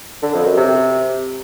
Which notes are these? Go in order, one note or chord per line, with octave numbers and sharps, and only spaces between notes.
D3
F2
F#2
C3